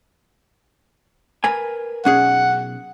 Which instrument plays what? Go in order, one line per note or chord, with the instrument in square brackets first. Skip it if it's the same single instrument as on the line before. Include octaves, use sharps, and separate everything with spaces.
[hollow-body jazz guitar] A#4 B4 G#5
[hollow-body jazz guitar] B1 C#4 G#4 [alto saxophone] F#5